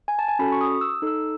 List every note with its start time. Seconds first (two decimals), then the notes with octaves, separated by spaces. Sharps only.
0.08 G#5
0.19 A5
0.28 G#5
0.39 C#4 F#4 A4 B5
0.52 C#6
0.61 D#6
0.81 E6
1.02 D#4 A4 E6